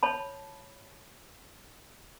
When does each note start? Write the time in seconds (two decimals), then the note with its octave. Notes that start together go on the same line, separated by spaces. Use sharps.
0.03 C#5 A5 B5